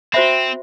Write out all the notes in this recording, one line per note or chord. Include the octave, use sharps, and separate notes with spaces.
C4 F#4 C5 E5 B5